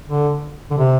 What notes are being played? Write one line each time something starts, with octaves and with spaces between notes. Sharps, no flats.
D3
D3
C3